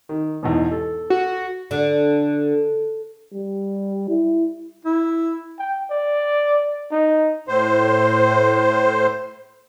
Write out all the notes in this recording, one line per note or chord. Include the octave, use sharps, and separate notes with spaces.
D#3
E2 G#2 B2
A4
F#4
D3
G3
E4
E4
G5
D5
D#4
A2 C5